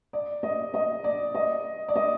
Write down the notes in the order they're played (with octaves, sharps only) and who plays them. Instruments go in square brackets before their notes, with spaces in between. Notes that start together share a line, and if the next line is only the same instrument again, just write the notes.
[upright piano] D5
D#5
D#5
D5
D#5
D5
D#5